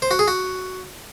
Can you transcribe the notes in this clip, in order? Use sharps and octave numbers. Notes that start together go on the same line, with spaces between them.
C5
F#4
G#4
F#4